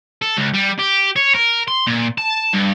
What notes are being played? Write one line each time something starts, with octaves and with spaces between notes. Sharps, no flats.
A4
C#2
G3
G4
C#5
A#4
C6
A#2
A5
G2